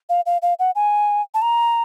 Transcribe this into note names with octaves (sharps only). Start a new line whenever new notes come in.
F5
F5
F5
F#5
G#5
A5
A#5